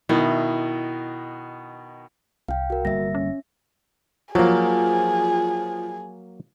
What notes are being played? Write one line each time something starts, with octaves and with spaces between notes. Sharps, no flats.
B2 D#3 E4
C2 F5 G5
F#4 A#4
G1 G3 A#3 E5 A#6
C#4
F3 F#3 A#3 G#4